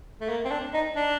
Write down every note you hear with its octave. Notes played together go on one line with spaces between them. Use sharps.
A3
A#3
C4
D4
D#4
D4